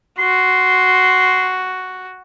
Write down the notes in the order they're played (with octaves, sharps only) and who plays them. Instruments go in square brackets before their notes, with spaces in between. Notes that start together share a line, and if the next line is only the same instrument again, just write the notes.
[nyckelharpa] F#4 [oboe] C6